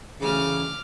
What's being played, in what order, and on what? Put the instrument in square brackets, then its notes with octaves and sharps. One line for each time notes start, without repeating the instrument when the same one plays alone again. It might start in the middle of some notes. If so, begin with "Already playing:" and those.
[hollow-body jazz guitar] D2 E3 A3 [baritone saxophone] C#3 [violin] D6 F6